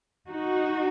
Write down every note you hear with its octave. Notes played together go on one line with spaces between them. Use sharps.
D#4 F#4